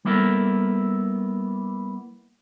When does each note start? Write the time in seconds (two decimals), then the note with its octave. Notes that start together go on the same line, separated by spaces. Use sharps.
0.05 G3 A#3 B3 E4 A4 A#4